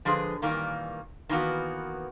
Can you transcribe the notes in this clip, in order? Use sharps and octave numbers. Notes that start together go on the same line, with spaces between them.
D3 F3 G#3 G#4 B4
A#2 D#3 E3 G3 A#3
D#3 E3 A#3 B3 F#4